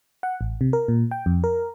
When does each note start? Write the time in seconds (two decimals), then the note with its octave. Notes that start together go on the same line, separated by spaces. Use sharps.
0.23 F#5
0.41 A1
0.61 C3
0.73 A#4
0.88 A#2
1.11 G5
1.26 F2
1.44 A#4